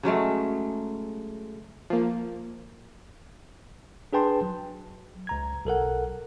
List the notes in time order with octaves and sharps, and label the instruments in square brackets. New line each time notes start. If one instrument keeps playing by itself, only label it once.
[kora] C#3 F#3 G#3 A3
[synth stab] F3 A#3
[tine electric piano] D4 G#4 B4 G5 A5 C6
F#3
C#2 A#5 G#6
B1 A4 A#4 F#5